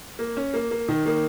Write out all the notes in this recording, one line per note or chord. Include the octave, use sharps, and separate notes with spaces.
A#3
C#4
A#3
A#3
D#3
A#3